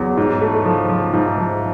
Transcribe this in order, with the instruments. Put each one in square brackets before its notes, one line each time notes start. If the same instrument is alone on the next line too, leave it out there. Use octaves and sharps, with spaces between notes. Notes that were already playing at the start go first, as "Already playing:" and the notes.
Already playing: [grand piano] E2 F#3
G#2
A3
F3
F3
G#2
F3